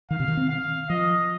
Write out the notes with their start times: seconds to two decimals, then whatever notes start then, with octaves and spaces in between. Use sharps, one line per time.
0.11 D#3 F5
0.20 C3
0.28 D#3
0.37 C4
0.50 F5
0.90 F3 D#5